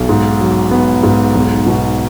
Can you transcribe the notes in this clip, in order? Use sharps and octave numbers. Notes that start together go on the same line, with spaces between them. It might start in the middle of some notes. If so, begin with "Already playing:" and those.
Already playing: B1
G#2
F#3
B3
G#2
B1
B2